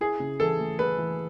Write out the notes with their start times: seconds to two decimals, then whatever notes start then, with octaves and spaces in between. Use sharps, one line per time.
0.01 E4 G#4
0.20 C#3
0.40 E3 A4
0.59 A3
0.79 A3 B4
0.98 E3